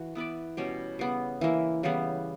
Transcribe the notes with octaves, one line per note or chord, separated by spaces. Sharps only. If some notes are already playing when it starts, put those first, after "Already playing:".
Already playing: E3 F#4
B3 E4 B4 D5
B2 G3 C#4 G4
C#3 G3 B3
E3 A#3 E4
C#3 E3 G3 B3